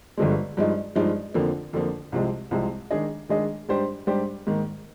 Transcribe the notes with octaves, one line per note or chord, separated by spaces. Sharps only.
G1 G2 D3 F3 G#3
G2 F3 G#3 D#4
G2 F3 G#3 D#4
F2 D3 F3 A#3
F2 D3 F3 A#3
C2 C3 F3 G#3
C2 C3 F3 G#3
D#3 G#3 D4 G#4 D#5
D#3 G#3 D4 G#4 D#5
G#2 G3 D4 G4 C5
G#2 G3 D4 G4 C5
G#2 D#3 A#3